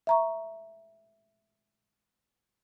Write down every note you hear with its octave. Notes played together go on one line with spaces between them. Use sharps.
E5 A#5 C#6